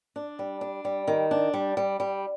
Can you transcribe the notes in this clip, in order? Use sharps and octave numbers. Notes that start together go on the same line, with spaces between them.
D4
G3
D4
G3
D#3
D4
G3
G3
G3